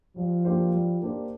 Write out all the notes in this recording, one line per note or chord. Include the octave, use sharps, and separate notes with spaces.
F3 G3
A#3 D4 G4 C5
G3
A#3 D4 G4 C5